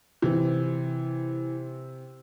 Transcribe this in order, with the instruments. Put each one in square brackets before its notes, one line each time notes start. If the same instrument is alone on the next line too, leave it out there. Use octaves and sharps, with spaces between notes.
[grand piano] C3 [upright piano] E3